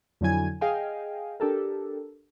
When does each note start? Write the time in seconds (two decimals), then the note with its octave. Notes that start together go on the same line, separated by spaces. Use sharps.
0.21 F2 D3 F#3 E4 G#5 G#6
0.61 G#4 D#5 F5 G5 G#5
1.40 D4 G4 A4 A#4